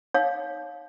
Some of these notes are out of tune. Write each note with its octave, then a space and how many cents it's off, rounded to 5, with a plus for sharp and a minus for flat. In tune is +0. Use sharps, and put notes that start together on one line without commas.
D#4 +0 C#5 +0 F5 +25